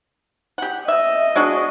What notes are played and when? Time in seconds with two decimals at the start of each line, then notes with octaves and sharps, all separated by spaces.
0.58 G4 F#5
0.88 D#5 E5
1.36 G#3 D4 F#4